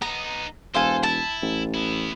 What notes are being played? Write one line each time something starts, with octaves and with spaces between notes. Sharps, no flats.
B3 D#4 A#5
E1 A4 C5 F5 G#5
E4 A5
A1
B3 E4